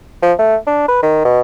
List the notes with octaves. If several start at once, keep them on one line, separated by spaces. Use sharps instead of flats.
F3
A3
D4
B4
D#3
B2